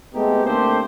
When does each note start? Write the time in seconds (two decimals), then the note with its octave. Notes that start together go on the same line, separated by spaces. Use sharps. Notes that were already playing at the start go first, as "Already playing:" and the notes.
0.14 G#3 A3 B3 C4 D#4 G4
0.44 D3 A3 A#3 C4 G4 C5